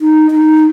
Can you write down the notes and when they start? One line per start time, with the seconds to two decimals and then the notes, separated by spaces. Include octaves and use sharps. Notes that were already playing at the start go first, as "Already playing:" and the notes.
0.01 D#4
0.31 D#4